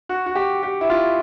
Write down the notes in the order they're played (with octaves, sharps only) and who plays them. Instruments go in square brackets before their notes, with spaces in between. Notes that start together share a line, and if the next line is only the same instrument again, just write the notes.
[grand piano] F#4
F#4
G4
G4
E4
F4